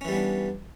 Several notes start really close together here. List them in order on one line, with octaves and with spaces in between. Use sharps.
C#4 E3 G3 B3 D4